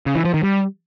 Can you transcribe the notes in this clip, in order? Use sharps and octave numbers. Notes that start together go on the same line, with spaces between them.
C#3
E3
F3
D#3
G3